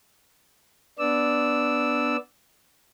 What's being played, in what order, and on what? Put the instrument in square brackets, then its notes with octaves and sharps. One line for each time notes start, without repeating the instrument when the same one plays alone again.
[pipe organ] B3 D4 D5 E6